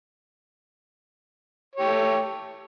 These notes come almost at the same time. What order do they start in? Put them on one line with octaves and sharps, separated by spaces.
C#5 G4 A3